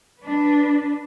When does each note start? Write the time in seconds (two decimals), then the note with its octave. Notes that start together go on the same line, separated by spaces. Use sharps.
0.21 D4 B4